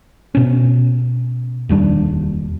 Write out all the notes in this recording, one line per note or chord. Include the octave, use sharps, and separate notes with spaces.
B2 C#4
F1 D#2 G3 D4